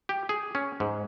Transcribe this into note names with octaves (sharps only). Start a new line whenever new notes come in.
G4
G#4
C#4
G#2